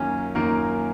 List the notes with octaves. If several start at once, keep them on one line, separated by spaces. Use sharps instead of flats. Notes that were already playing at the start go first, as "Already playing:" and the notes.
Already playing: F#2 D#3 A#3 C#4 F4 A#4
F#2 D#3 A#3 F4 A#4